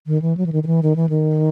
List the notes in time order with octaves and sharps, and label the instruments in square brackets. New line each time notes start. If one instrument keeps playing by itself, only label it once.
[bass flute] D#3
E3
F#3
E3
D#3
D#3
E3
D#3
E3
D#3